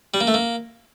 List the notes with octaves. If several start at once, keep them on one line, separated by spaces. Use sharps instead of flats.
G3
A#3
A3
A#3